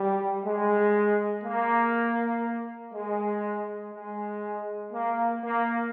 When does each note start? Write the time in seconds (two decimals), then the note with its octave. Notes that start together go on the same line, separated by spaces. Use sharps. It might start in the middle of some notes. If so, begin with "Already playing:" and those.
Already playing: G3
0.44 G#3
1.43 A#3
2.93 G#3
3.93 G#3
4.92 A#3
5.42 A#3